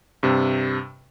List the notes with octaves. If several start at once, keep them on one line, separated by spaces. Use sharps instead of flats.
G2 C3